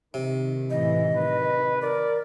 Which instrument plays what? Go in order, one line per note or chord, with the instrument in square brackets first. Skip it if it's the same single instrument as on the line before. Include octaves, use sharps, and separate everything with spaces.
[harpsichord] C3 [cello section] D#3
[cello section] F#2 A2 E3 [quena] D#5
[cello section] D#3 [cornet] B4
[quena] A#4 [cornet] D5